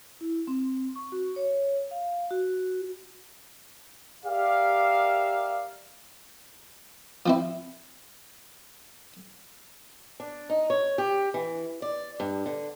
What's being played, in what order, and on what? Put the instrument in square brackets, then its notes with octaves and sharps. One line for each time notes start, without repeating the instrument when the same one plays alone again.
[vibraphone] E4
C4
C#6
F#4
C#5
F5
F#4
[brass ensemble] G4 A#4 D5 E5 F5
[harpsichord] F3 C4 E4
[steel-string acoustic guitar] D4
D#4
C#5
G4
E3
D5
G2
D3